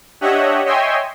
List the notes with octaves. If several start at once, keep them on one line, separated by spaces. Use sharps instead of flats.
D4 G4 C#5 D#5 E5 F#5
C#5 D#5 E5 G5 G#5 C6